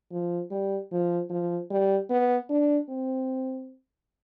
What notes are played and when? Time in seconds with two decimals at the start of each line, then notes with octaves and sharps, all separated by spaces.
0.12 F3
0.51 G3
0.92 F3
1.30 F3
1.71 G3
2.10 B3
2.50 D4
2.89 C4